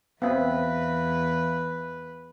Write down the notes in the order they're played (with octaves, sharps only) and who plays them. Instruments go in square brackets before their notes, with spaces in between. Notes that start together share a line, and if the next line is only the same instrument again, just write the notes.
[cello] E2 [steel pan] B3 C4 [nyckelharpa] B4 [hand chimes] E5 F5